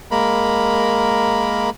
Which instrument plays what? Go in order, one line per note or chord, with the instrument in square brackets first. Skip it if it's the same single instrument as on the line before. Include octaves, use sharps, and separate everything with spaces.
[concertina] G#3 A#3 A#4 B5